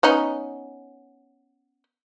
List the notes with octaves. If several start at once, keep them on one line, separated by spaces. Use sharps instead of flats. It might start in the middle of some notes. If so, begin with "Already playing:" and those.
B3 C#4 D#4